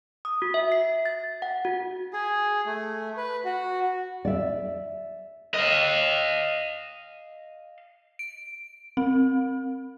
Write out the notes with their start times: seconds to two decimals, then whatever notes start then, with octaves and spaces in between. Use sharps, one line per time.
0.25 D#6
0.42 F#4
0.54 E5
0.72 C7
1.06 A6
1.42 F#5
1.65 F#4
2.13 G#4
2.66 A3
3.17 B4
3.45 F#4
4.25 D5 E5
5.54 D#5 F5
8.19 D7
8.97 C4